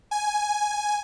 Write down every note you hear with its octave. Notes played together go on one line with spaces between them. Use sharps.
G#5